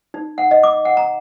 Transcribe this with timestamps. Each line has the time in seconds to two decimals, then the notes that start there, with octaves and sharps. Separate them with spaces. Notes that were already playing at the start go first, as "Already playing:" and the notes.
0.14 D#4
0.38 F#5
0.51 D#5
0.63 D6
0.85 F#5
0.97 A#5